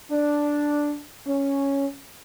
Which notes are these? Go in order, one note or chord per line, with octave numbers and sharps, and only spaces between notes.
D4
C#4